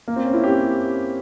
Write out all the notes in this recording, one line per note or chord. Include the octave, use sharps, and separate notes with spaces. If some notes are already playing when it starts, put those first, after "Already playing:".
A#3
C4
C#4
E4
G4